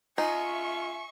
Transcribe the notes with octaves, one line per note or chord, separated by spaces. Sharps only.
D#4 F4 E5 G#5 C#6